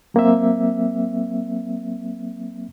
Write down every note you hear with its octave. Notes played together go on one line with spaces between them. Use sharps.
F#3 A#3 C4 E5